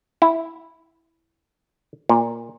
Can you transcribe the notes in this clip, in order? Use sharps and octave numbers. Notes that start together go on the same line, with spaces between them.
E4
A#2